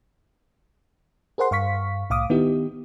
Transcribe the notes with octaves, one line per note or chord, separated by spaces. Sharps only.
G#4 A#4 C5 F#5 C6
G2 F5 C#6 B6
C2 A2 F5 D6 D#6
D#3 B3 D#4 E4 G4